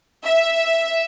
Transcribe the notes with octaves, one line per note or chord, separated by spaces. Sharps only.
E5